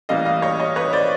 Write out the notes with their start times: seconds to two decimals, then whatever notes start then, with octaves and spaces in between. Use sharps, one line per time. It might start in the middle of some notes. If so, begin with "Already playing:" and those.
0.09 A2 E3 G3 A#3 D#5 F5
0.25 D#5 F5
0.42 C#5 D#5
0.60 C#5 D#5
0.76 B4 C#5
0.93 C5 D5